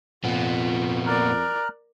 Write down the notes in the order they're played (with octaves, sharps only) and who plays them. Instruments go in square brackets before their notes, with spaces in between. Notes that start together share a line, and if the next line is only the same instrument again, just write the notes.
[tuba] F2 [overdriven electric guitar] A#2 B3 [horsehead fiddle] F4
[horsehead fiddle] A#4 D5 [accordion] A#5 F6 F#6